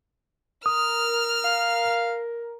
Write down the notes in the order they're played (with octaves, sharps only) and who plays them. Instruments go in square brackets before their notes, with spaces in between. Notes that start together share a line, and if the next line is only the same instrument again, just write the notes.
[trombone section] A#4 [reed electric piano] D#6 [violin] F6
[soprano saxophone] F5